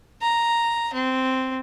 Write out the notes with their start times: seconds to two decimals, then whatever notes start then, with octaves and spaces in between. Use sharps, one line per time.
0.22 A#5
0.93 C4